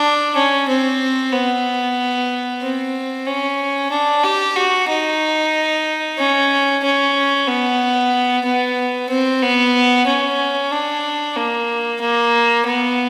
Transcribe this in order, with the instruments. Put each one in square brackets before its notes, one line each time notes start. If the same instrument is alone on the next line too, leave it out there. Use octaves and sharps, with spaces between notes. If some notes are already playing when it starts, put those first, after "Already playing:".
Already playing: [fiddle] D4
C#4
C4
B3
C4
C#4
D4
G4
F#4
D#4
C#4
C#4
B3
B3
C4
B3
C#4
D4
A#3
A#3
B3